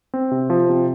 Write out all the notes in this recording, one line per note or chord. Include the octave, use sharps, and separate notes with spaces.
C4
C3
F3
C3